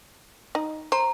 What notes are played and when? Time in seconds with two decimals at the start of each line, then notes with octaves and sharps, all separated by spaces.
0.55 D#4 D#5
0.92 C5 A#5